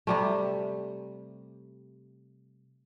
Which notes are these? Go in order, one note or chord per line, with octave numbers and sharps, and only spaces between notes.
C3 G3 A3